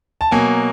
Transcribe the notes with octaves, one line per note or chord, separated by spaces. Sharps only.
A5
B2 F#3 A#3 G#5